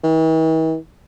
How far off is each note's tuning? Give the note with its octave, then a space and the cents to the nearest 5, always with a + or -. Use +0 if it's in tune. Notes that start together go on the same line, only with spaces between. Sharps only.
E3 -45